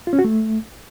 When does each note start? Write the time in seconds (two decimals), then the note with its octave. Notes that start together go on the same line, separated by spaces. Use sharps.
0.07 F4
0.13 C#4
0.19 F#4
0.24 A3